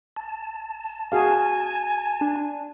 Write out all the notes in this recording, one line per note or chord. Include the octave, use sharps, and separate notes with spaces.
A5
F#4 G#4 F5 G#5
D4